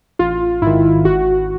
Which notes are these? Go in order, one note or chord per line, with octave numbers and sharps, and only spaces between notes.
A1 F4
G#2 D#3 E4
G#1 F#4